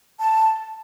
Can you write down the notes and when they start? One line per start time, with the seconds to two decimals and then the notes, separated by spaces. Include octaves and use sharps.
0.18 A5